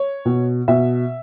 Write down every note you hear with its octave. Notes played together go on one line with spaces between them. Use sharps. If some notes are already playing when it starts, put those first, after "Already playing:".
Already playing: C#5
B2
B2 E5